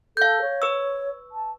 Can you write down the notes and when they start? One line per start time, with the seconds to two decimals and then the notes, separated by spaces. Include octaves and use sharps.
0.17 A4 F5 G6
0.41 C#5
0.62 B4 C#6 E6
1.32 A5